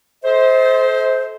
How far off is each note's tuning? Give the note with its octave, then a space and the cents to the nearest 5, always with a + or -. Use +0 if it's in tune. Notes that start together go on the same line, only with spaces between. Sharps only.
A4 -25 C5 +0 D#5 +45